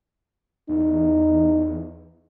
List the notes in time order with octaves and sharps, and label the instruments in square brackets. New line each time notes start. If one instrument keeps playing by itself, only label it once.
[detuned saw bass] E2 [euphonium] D#4